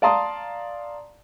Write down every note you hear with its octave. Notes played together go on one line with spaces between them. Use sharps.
D5 F5 A5 A#5 C6 D#6